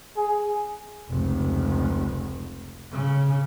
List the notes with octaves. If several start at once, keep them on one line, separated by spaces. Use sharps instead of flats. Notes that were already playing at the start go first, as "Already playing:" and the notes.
G#4
F1 C#2
C#3